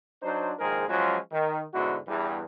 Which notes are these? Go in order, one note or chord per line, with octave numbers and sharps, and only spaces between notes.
F#3 D4 D#4 C5
A#1 G#2 D#3 G#4 A#4 C5
F3 F#3 G#3 C#4 F4 F#4
D#3
G#2 B2 D3 E4 F#4
E2 G2 E3